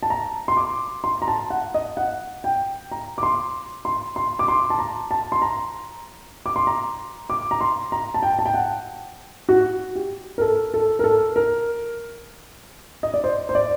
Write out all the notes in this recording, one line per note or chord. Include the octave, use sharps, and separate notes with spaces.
A5
A#5
C6
D6
C6
A#5
A5
F#5
D#5
F#5
G5
A#5
D6
C6
C6
C6
D6
C6
A5
A#5
A5
C6
A#5
D6
C6
A#5
D6
A#5
C6
A#5
A5
G5
A5
G5
F#5
F#4
G4
A#4
A4
A4
A#4
A4
A#4
D#5
D5
C5
C5
D5